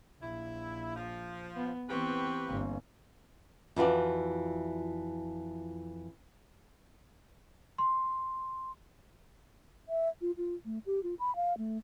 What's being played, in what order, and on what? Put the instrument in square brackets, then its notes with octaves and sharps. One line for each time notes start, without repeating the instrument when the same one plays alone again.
[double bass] A#1 [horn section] E4
[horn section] F3
[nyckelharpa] B3
[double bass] E3 B3 [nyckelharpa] C4 C#6 [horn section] G4 B4
[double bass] G1 A#3
[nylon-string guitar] F2 E3 F4 F#4 D5
[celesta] C6
[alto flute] E5
F4
F4
A3
G4
F4
B5
F5
A3